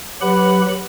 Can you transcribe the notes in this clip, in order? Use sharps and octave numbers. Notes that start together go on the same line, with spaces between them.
F#3 G4 B4 F#5 B5